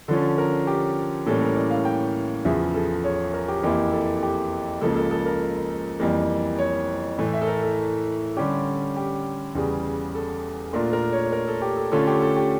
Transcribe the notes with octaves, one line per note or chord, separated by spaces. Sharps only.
D3 F3 C#4 A4
A#4
G4
A2 E3 G3 A#3 C#4 A4
A#4
D5
F5
G5
E2 C#3 F3 E5
A4
C#5
A#4
G4
F2 E3 A#3 E4 G4
A4
G4
C#2 C#3 F3 A#3 A4
A4
A4
A#4
F2 E3 G3 A#3
C#5
A2 E3 A3
E5
A4
A#4
A4
D3 G3 C#4 G4
G4
E2 C#3 G3
A4
A#2 A3 D4 F4 A#4
A#4
C#5
A#4
A4
G4
A4
D3 A3 C#4 F4 A4
G4
A4
G4